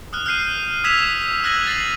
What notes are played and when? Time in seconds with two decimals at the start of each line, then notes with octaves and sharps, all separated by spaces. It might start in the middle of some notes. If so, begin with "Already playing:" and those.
0.13 D#6 F6 F#6
0.26 F6 G6 C7 D#7
0.84 D#6 E6 G#6 B6 E7 F7
1.44 E6 F#6 G#6 A#6 D#7 F#7
1.67 A6 C7 F#7